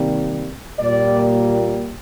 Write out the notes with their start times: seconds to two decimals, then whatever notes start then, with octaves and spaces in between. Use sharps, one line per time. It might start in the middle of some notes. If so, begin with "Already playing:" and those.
Already playing: C3 D#3 G3 A#3
0.79 A#2 G3 A#3 D5